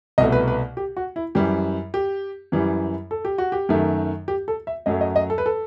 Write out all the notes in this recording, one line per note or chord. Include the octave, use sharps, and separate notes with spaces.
C2 B2 A3 D#5
B4
B4
G4
F#4
E4
F#2 E3 G3 G4
G4
F#2 E3 G3
A4
G4
F#4
G4
F#2 D#3 A3
G4
A4
E5
F#2 F#3 A3 D#5
D#5
D#5
A4
B4
A4